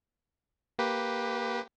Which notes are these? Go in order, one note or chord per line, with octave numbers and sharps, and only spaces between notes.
A#3 G4 B4